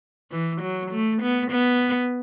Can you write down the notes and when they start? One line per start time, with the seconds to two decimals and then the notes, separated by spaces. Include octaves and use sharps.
0.31 E3
0.61 F#3
0.91 A3
1.22 B3
1.51 B3